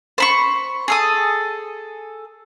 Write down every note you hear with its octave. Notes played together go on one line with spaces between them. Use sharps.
C5 B5 C#6
G#4 A4 D#6